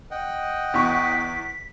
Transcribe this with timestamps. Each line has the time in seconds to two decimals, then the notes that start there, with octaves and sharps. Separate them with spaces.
0.11 D#5 F#5 G5
0.74 E2 C#6 B6